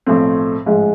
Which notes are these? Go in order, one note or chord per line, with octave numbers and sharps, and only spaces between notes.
B1 A2 F3 A3 C4
A1 G#2 F3 G#3